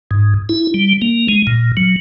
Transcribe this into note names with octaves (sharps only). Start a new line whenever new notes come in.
G#2
E4
G3
A#3
G#3
A#2
F#3